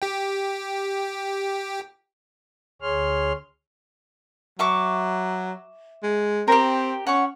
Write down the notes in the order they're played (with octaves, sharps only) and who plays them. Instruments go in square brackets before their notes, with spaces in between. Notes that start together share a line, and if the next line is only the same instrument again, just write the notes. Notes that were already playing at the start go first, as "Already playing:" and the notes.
[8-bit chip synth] G4 G5
[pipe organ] D2 G#4 C#5 C6 F6
[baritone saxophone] F#3 [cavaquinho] E5 C#6 D6
[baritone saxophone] G#3
[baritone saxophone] C4 [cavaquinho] G4 A#4
[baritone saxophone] C#4 [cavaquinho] F#5 C#6